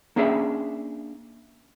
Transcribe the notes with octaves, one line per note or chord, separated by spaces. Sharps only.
A#3 C#4 D4 G#4 E5